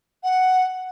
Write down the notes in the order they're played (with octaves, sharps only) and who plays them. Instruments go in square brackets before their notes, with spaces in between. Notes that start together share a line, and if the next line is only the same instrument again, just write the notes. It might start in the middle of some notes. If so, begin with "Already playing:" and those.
[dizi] F#5